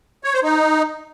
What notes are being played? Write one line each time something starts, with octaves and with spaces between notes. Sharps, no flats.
C#5
C5
D#4